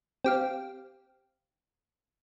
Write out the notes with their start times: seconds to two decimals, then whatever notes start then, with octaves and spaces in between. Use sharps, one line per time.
0.24 C4 G4 F5